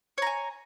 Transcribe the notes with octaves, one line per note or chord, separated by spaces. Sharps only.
C#5 G#5 A#5